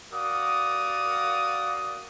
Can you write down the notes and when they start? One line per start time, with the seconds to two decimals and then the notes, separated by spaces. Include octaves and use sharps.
0.13 F#4 A#4 D5 F5 D6 D#6